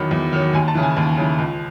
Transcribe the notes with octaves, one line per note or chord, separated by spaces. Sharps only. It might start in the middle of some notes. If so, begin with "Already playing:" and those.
Already playing: E2 D#3 F#3 B5
E2
D#3 F#3
D#2 G#5
A5
C#3 E3
G#5
D#2
C#3 E3
C#2